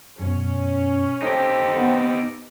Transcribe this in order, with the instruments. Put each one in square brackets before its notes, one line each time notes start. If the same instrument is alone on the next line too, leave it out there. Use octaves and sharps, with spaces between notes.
[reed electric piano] F#2 B2 [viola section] C#4
[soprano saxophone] C4 [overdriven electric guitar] D#4 G4 [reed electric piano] A4
[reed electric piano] B3